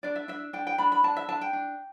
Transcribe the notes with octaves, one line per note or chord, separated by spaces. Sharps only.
D4 D5
E5
D4 E5
D4 G5
G5
D4 B5
B5
D4 A5
E5
D4 A5
G5
D4